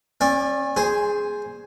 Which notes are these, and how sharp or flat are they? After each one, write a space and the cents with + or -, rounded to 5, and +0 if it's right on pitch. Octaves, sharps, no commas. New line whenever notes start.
C#4 -35 D5 +0
G#4 +0 C5 +0